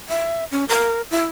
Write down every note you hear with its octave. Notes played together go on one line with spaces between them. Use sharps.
E5
C#4
A#4
E4